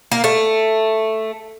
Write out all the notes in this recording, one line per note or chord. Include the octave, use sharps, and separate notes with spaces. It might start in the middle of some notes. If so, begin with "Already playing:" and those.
A#3
A3